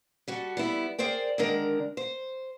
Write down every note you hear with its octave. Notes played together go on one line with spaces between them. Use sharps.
G3 F#4 A4
G3 B3 E4
G#4 A#4 C5 D5 G5
D3 D#3 G#3 D4 A#4
C5